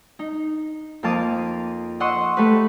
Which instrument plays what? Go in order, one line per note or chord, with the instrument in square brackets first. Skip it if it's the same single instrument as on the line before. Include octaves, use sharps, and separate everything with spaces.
[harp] D#4
F2 A#3 F5 A5 D6 D#6
D#5 F#5 C6 C#6 E6
A3 G4 B4